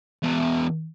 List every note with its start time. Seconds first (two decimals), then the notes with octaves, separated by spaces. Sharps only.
0.23 E2 B2